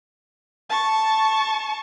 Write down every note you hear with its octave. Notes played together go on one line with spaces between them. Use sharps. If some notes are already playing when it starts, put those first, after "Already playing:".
A5 C#6